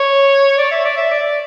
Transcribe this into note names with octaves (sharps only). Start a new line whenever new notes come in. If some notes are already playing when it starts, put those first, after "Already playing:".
Already playing: C#5
D5
E5
D5
E5
D5